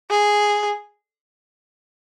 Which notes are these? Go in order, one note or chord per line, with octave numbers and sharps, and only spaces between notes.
G#4